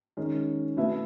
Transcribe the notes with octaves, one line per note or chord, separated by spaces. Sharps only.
D#3 G#3 C#4
B2 A3 E4 B4 E5